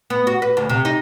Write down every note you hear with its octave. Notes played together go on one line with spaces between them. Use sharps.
B3
F#4
B4
D2
C3
D#4